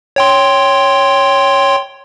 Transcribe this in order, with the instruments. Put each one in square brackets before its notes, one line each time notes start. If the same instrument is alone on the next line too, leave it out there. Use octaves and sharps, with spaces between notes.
[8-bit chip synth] C#5 G5 C6